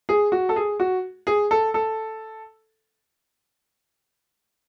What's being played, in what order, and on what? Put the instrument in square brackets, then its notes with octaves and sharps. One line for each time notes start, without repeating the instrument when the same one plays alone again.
[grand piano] G#4
F#4
A4
G#4
F#4
G#4
A4
A4